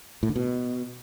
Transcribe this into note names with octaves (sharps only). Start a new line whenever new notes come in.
A2
D3
B2